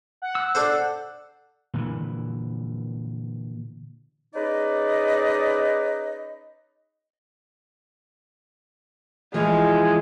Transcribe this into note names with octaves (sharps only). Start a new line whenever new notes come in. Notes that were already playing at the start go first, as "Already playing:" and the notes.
F#5
E6
D4 A4 C5
A#2 D3 E3
C#4 D#4 G#4 B4 D5 D#5
E3 F3 G#3